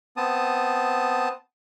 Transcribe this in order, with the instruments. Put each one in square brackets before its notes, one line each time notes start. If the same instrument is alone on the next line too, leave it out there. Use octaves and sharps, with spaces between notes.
[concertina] B3 C4 A5 D#6